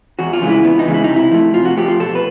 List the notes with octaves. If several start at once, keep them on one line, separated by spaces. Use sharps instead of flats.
E2 F#4
F4
C#3 E3 G#3
E4
E2 B3
D#4
C#3 E3 G#3
E4
C3 D#4
E4
F3 A3
C3 F4
F#4
F3 A3 G4
F4
B2 A4
B4